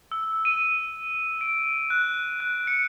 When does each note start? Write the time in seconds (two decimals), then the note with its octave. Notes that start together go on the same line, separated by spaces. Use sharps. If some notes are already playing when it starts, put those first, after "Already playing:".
0.12 E6
0.45 D#7
1.41 D7
1.90 F#6
2.40 F#6
2.67 C#7